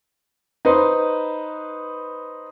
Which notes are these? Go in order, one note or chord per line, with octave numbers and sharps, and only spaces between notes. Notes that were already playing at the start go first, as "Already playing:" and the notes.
D#4 B4 C5